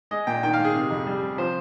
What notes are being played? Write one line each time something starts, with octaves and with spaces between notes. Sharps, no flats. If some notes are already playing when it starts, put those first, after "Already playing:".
G#3 D#5
A#2 G5
D#3 G5
F5
G#2
G#4
C3
F2
G3
C3
F3 C5